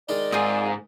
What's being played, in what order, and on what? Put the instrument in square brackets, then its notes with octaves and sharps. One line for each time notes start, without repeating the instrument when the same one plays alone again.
[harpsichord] D#3 G#3 D#4 [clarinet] D5
[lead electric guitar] G#2 [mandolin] C4 F4 G#4